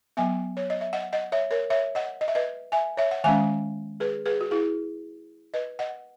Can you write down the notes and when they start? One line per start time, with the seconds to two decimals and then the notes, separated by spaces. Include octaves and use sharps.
0.17 F#3 B3 E5 G#5
0.57 C#5
0.70 D#5
0.81 E5
0.93 D#5 F#5
1.13 D#5 F#5
1.32 C#5 E5
1.51 A#4 C#5
1.70 C#5 E5
1.95 D#5 F#5
2.21 D#5
2.28 E5
2.35 B4 D#5
2.72 E5 G#5
2.97 C#5 E5
3.11 F#5
3.24 D#3 G#3 C#4 E5 G#5
4.00 G#4 B4
4.26 G#4 B4
4.41 F#4
4.51 E4 G#4
5.54 B4 D#5
5.79 D#5 F#5